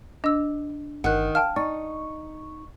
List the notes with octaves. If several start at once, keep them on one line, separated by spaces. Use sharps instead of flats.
D4 D#5 E6
G1 D#3 F#5 F#6
F5 G5 A5 F6
D#4 D5 C#6